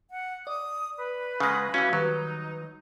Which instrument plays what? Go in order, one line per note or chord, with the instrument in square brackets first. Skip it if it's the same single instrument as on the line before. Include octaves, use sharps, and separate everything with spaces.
[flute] F#5
[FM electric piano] D5 [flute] D#6
[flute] B4
[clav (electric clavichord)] C#3 G#3 [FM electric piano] F#5 F#6 A#6
[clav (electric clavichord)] E3 C#4 [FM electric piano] F#4 F5
[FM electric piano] D#3 G3 B4 [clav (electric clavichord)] F#3 [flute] D#4